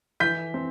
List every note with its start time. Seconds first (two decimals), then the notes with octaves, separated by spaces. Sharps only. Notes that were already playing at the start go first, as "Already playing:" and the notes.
0.20 E3 G6 B6
0.54 C4